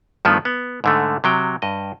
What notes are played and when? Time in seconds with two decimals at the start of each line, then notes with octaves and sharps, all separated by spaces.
0.25 G2 D#3 F3 A3 B3
0.45 B3
0.84 G#2 D3 A3
1.24 C3 F#3 G5
1.62 G2 D#5